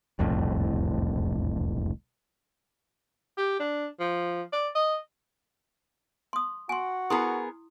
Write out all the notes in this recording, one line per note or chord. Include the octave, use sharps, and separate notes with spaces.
E1 C2 F2 A2
G4
D4
F3
D5
D#5
C6 D#6
F#4 G#5 C6
B3 E4 G#4 A#4 C6 D#6